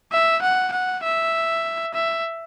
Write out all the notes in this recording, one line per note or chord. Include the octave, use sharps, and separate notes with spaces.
E5
F#5
F#5
E5
E5